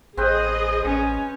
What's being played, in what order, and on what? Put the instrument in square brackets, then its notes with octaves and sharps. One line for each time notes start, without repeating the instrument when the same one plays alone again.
[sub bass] A1 [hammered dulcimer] C4 B4 G5 [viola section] G#4 D#5
[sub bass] A1 [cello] C#4